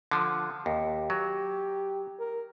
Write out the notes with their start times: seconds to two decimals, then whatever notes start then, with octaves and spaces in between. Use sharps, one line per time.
0.11 D3 F3
0.66 D#2 G4
1.10 F#3
2.19 A#4